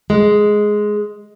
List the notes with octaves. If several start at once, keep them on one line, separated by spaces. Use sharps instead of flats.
G#3